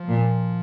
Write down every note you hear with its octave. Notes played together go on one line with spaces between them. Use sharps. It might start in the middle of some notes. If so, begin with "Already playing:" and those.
Already playing: F3
A#2